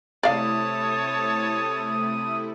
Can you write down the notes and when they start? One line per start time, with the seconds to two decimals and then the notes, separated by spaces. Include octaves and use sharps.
0.23 C3 A3 E4 C#5 D5 F5 A5 D#6